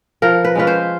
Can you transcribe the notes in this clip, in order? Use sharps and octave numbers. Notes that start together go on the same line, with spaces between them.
F3 A#4
B4
G#3 C#4 F4 B4
C5